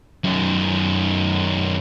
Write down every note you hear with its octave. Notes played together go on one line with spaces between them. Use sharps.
F#2 D#3